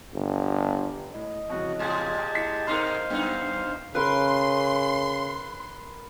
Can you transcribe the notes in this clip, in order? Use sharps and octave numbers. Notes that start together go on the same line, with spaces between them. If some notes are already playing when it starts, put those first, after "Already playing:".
G1
A2 D#5
F2 C#3 E3 F#4
A2 G#3 G4 A5 G#6
E4 B6 C#7
B2 D#4 A#4 C5 F5 C6
F#2 B3 D#4
C#3 A#4 B4 C6